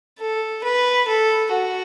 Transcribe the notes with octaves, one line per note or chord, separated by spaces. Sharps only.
A4
B4
A4
F#4